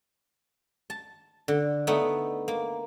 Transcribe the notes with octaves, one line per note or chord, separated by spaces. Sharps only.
A5
D3
A3 B3 D4 D#4
A#3